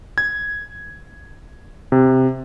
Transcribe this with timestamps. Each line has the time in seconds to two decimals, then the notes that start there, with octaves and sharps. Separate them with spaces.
0.18 G#6
1.92 C3